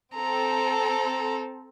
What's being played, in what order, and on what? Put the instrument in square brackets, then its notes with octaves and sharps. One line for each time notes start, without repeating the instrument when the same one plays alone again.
[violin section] C4 A4 [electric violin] A#5